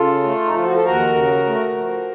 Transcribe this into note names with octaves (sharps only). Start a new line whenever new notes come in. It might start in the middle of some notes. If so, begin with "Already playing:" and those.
Already playing: C#3 F4 A4
A3
D#4
F3 F4
F#4
A4
D#2 F#4 A#4
C#3
A3
F3